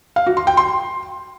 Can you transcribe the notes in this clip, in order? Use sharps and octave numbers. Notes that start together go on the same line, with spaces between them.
F5
F#4
C6
G5
C6